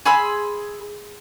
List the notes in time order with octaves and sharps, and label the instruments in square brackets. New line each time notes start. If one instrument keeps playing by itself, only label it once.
[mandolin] G#4 B5 C6 E6